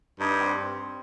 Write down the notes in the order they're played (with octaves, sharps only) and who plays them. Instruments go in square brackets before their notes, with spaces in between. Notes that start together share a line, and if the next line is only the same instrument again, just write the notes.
[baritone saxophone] G2 [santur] D#4
[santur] D4
C4